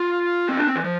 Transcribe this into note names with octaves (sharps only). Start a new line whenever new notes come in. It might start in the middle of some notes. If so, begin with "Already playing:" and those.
Already playing: F4
C4
D4
C4
E3
F3